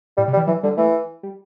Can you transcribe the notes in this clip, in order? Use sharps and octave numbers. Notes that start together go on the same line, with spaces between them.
A2 G3
C3
G3
E3
E3 F#3
D3 G3
E3 A3
G3